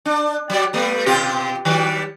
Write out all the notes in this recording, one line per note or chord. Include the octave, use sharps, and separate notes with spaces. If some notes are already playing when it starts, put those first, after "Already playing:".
D4
F#3 G3 D5
G3 A3 B3
B2 F4 G4
D#3 F#3 G3